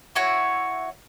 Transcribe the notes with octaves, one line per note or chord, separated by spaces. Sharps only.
E4 F#4 C#5